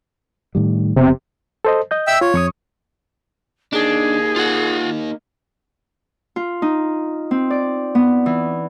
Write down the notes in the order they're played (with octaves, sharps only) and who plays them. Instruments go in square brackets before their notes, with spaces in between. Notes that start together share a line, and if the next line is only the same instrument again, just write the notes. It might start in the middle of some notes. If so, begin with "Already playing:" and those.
[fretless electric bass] A2 D#3 G3
[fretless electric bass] F1 B3 [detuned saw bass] C3
[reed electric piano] A4 C5 D#5
D#5 G6
[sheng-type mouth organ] E5 G5 E6
[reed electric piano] F4 [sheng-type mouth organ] C#5
[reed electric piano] F2 C#6 D#6
[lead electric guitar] A#3 D#4 [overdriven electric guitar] D4 [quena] G#4
[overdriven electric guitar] F4 F#5
[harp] F4
D#4
C4
D5
B3
E3